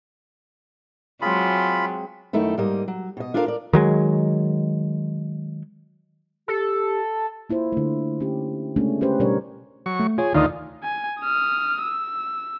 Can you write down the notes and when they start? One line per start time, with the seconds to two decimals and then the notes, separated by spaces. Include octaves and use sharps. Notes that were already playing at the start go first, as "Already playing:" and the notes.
1.22 F#3 G#3 C4 F4 B5
2.33 F#2 D#3 A3 D#4 E4
2.58 G#2 G3 A#3 D#5
2.88 F#3
3.17 B2 D#5
3.34 D4 F4 A4 A#4 C5 F5
3.46 A#4 D5
3.73 D#3 F#3 G#3
6.48 G4 A4
7.50 A#3 E4 F4 C5
7.72 D3 A3
8.20 C#4 G4
8.76 C#3 G#3 A3 B3 C#4 D4
9.01 C#4 G4 B4 C5
9.20 B2 G3 D4 A#4 C#5 D5
9.86 F#3 C#6
10.00 A3
10.18 F4 G#4 C#5
10.34 D2 D#3 D#4 F4 D5 D#6
10.83 G#5
11.21 D#6 F6
11.83 E6